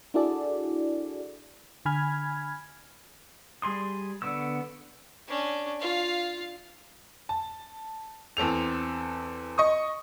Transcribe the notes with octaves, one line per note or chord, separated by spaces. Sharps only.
D4 E4 F#4 G#4 A4 D5
D3 G#5 B5 F6 G#6
G3 G#4 C6 D#6
D3 B3 C#6 E6
C#4 D4
F4 F5
A5
E2 C4 A4 F7
D#5 C#6 D#6